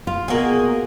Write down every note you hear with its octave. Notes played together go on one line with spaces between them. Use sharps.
F4
B2 A#3 F#4 G#4 A#4